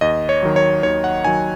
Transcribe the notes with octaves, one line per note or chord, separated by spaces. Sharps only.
D#2 D#5
C#5
D#3 F#3
C#5
D#2 C#5
F#5
D#3 F#3 G#5